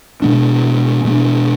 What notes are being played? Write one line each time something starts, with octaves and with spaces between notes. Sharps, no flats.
B2 G#3 B3 D4
B2 G#3 B3 D4